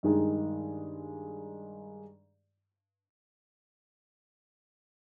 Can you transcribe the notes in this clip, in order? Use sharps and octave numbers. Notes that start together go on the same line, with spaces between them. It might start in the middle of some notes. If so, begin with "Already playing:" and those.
G2 D#3 G#3 D#4 G#4